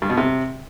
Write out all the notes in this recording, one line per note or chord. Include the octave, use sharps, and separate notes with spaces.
G2
B2
C3